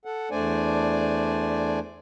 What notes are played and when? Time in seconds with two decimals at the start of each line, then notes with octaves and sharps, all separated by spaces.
0.05 A4 F#5
0.31 E2 A3 D4 C5 D5 G#5